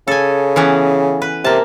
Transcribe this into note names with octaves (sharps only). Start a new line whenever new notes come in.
C#3 A4 G#5
E3 B3 C#4
B4
C3 A#3 A5